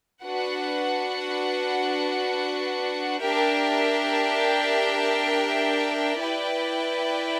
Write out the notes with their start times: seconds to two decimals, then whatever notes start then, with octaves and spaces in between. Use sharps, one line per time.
0.23 D4 F#4 B4 F#5
3.20 D4 G4 A#4 E5 G5
6.18 E4 B4 D5 G5